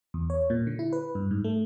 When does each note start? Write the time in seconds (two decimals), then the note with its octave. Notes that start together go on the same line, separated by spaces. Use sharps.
0.14 E2
0.30 C#5
0.50 A#2
0.67 D3
0.79 E4
0.93 B4
1.15 G2
1.31 G#2
1.44 A3